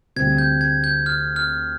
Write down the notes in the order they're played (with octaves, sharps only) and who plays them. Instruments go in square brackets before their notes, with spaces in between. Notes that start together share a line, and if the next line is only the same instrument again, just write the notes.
[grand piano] D2 C3 G3 C4 [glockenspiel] G#6
[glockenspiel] G6
G#6
G6
F6
F6